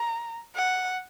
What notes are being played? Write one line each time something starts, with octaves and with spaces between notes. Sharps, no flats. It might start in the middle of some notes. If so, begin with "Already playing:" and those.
Already playing: A#5
F#5